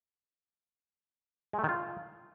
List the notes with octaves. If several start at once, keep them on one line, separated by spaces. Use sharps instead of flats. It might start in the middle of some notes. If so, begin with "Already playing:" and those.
G#3
A3
D#3
F4